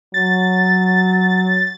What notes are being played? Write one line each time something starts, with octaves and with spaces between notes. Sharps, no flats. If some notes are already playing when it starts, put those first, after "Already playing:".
F#3 A6